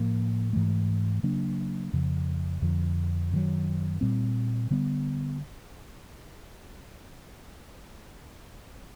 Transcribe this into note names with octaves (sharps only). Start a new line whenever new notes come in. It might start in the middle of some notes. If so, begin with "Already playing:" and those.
Already playing: A2 F3 A#3
G#2 E3 A3
C#3 F#3 A#3 D4
F2 C#3 F3
F2 D3 F3
F#2 D#3 F#3
A#2 G3 C4
D3 G3 B3